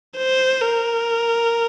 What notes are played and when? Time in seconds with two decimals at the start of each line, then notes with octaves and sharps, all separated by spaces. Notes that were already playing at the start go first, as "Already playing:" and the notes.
0.17 C5
0.61 A#4